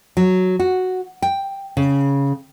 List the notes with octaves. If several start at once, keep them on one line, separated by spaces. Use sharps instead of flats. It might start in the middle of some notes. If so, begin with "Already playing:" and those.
F#3
F#4
G5
C#3